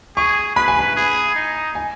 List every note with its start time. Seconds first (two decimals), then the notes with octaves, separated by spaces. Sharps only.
0.17 G#4 C#6
0.56 B4 B5
0.68 G#5
0.79 B5
0.97 G#4
1.36 D#4
1.75 G#5